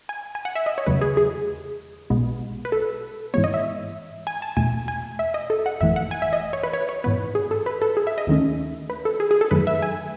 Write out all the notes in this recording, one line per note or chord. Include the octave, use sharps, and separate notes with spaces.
G#5
G#5
F#5
E5
D#5
C#5
E2 C#3 F#3 A3 B4
G#4
G#4
B1 B2 G#3 B3
B4
A4
G#2 E3 G#3 B3 C#5
D#5
E5
G#5
A5
E2 B2 A3 G#5
G#5
E5
D#5
A4
F#5
G#1 F#2 E3 A3 E5
F#5
G#5
E5
D#5
C#5
B4
C#5
C#5
G#2 E3 B3 B4
G#4
A4
B4
A4
G#4
E5
D#5
D#2 D#3 A3 C#4
B4
A4
G#4
G#4
A4
F#2 D#3 F#3 A3 B4
E5
G#5